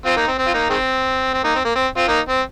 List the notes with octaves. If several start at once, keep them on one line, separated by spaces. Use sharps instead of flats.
C4 F4
A#3 D#4
C4
C4
F4
A#3 D#4
D#3 G#3 C4
C4
A#3 D#4
C4
A#3
C4
C4 F4
A#3 D#4
C4